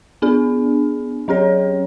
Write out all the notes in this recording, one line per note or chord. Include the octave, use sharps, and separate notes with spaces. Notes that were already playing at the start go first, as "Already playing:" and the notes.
B3 D4 G#4
F#3 C#4 G#4 C#5